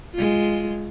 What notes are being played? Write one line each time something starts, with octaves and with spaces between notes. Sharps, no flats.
G#3 F4